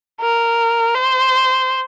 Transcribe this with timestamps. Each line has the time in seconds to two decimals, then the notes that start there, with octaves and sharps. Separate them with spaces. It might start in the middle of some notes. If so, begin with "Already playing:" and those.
0.21 A#4
0.94 C5